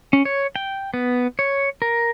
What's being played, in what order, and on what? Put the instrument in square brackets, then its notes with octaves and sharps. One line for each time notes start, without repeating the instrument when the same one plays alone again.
[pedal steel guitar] C#4
C#5
G5
B3
C#5
A#4